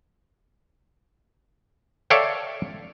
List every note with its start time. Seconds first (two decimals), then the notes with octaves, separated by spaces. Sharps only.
2.10 A4 C#5 D5 E5 F5 G5